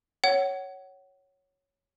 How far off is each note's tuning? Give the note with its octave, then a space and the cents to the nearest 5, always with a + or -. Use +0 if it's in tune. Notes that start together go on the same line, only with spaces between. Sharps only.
C#5 +0 F#5 +25